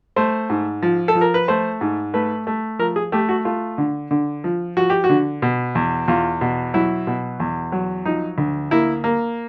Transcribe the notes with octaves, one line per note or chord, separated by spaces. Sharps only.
A3 C5
G#2
F3
A4
F3
A#4
B4
A3 C5
G#2
A3 B4
A3
F3 A#4
G#4
A3 G4
F#4
A3 F4
D3
D3
F3
F3 F#4
G4
F#4
D3
B2
E2
E2 F4
B2
F#3 E4
B2
E2
F#3
F3 D#4
D2
A#3 E4
A#3